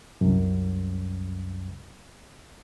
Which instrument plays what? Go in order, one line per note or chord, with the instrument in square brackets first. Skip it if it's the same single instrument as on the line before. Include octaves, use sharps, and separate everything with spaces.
[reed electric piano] C2 F#2